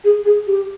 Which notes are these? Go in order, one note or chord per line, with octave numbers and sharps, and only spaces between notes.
G#4
G#4
G4